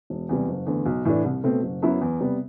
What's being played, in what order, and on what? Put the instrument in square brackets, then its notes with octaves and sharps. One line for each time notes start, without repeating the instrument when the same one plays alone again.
[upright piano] E1
E2 C3 G3
F#1
E2 D3 A3
B1
A2 E3 A3 D4
C2
B2 A3 C4
F#1
F#2 F#3 B3 E4
E2
C3 G3 B3